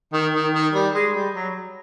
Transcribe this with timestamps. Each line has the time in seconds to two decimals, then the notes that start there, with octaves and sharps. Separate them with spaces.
0.13 D#3
0.34 D#3
0.53 D#3
0.73 G3
0.94 G#3
1.14 G3
1.34 F#3